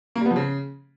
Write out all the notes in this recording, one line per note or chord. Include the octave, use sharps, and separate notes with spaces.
A#3
G3
B3
F3
C#3